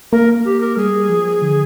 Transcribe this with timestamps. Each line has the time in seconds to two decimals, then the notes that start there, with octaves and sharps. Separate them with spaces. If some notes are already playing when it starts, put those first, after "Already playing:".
0.12 A#3 A#4
0.45 G4
0.61 A#4
0.77 G3 G#4
1.09 F3
1.42 D3